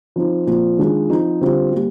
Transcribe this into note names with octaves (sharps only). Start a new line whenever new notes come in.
F3 C4 D#4
A#2 F3 C4
D#3 G#3 D4 F4
F3 C4 D#4
D3 G3 C4 F4
G3 A#3